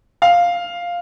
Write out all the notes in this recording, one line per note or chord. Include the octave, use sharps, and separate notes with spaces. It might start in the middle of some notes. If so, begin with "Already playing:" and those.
F5